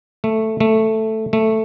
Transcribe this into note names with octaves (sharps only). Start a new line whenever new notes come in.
A3
A3
A3